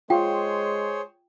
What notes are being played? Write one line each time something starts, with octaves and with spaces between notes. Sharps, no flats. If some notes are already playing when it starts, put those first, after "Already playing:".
G#3 F4 G#4 C5 C#5 G5